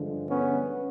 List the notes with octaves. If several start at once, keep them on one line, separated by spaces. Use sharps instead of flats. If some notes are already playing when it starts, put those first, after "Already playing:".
Already playing: G2 D3 F3 G#3
B3 C#4